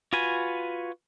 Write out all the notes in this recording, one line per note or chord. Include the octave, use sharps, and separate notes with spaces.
F4 F#4 B4 G#5